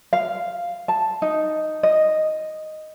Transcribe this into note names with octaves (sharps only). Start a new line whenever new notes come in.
F5
A5
D#4
D#5